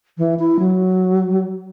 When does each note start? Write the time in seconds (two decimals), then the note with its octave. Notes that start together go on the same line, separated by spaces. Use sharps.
0.18 E3
0.39 E4
0.59 F#3